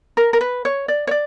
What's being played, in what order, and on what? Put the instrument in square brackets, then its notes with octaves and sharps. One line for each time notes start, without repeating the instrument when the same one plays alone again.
[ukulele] A#4
A#4
B4
C#5
D5
C#5
D5